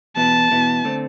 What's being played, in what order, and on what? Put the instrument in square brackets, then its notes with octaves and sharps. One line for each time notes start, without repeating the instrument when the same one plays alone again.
[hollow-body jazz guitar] E2 B2 B3 E4 [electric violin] A5
[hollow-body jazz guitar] E2 B2 B3 E4
D3 A3 C4